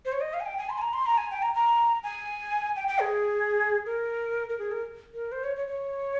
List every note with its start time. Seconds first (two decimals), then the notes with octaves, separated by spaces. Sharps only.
0.05 C5
0.12 C#5
0.21 D#5
0.34 F5
0.40 G#5
0.46 G5
0.58 G#5
0.70 C6
0.78 G#5
0.82 A#5
0.93 C6
1.06 A#5
1.18 G#5
1.31 G5
1.42 A#5
1.54 A#5
2.03 G#5
2.76 G5
2.88 G5
3.01 G#4
3.86 A#4
4.49 A#4
4.59 G#4
4.71 A#4
5.14 A#4
5.32 C5
5.44 C#5
5.56 C#5
5.67 C#5